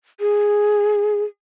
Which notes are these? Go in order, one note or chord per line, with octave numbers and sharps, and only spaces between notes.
G#4